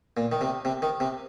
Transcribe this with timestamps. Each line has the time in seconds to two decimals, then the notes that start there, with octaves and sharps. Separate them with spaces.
0.17 A#2
0.32 D#3
0.41 C3
0.65 C3
0.82 D#3
1.00 C3